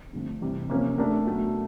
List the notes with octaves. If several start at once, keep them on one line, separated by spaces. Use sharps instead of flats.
G2 D3 F3 A3 C4
C3 E3 G3
C3 F3 A#3 C#4
A3 D4 G4 A#4
B2 F#3 A3